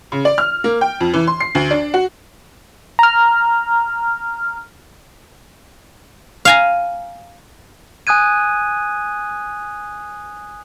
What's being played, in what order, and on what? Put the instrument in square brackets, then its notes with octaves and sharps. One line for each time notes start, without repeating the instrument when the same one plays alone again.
[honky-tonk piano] C#3
D5
F6
A#3
G5
F2
E3
C6
C7
D2
D4
F#4
[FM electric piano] A#5 F6
[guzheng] F5 G#5 A#5
[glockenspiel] G#5 D#6 F#6 G#6 D#7